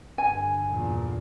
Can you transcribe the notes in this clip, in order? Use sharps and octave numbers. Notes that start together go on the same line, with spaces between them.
G2 D3 G#5
E2 A#2